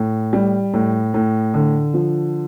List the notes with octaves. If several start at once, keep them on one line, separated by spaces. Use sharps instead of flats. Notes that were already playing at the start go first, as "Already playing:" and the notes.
Already playing: A2
G3
A2
A2
D3
F3